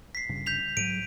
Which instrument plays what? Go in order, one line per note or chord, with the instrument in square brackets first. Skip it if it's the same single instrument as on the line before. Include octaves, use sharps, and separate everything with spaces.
[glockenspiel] B6 C7
[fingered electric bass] G1 G2 C#3
[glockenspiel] G6 B6 F7
[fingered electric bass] G#2 F#3 [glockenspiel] D7 D#7